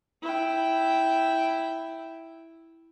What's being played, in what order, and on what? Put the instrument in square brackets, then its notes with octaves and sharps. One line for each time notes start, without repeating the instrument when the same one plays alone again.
[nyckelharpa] E4 G5